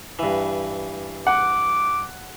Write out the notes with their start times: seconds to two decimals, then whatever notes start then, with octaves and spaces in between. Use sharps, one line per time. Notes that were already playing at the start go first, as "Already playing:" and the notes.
0.19 G2 E3
1.27 F#5 D6